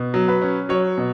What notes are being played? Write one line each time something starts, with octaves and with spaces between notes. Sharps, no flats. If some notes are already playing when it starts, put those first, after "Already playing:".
Already playing: B2
F#3
B4
C#4
F#3 C#5
B2